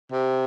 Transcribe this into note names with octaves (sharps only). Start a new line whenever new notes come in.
C3